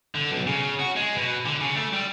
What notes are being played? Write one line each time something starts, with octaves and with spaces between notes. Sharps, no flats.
D3
B1
C#3
F#4
G#3
B2
D3
C#3
A3
G3